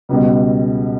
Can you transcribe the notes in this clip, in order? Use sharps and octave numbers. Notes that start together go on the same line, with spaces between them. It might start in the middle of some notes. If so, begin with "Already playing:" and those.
C#2 B2 G3